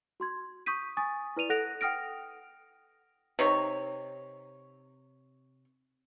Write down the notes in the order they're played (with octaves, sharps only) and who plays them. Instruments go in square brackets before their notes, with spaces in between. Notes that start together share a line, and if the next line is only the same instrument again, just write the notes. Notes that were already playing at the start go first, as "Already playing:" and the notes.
[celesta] F#4 C6 G#6
C#6 D#6 G6 B6 D#7
G#5 C#6 D#6 A6
E4 B4 D5 D#7 F7
A4 F#5 F#6 A#6 D7 F7
F#5 G5 D#6 F6 A#6 D7
[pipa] C3 D#4 C#5